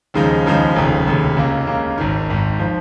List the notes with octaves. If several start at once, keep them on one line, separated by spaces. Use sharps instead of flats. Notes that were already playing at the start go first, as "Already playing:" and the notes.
D#2 C#3 F3 G#3 D#4
D#2 C#3 F3 G#3 D#4
F1 D#2 C#3
F1 D#2 C#3
C#2 C#3 A#3
C#2 C#3 A#3
G#1 G#2 D#3
G#1 G#2 D#3
F3